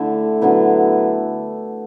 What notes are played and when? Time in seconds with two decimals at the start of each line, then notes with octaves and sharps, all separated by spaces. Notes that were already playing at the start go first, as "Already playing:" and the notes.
Already playing: D3 A3 E4
0.42 D3 F#3 B3 E4